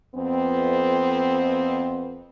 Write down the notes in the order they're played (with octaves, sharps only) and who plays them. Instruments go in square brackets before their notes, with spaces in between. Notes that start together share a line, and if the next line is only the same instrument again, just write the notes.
[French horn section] F2 B3 C4